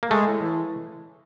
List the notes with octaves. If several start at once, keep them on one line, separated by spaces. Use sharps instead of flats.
A#3
G#3 A3
A2
E3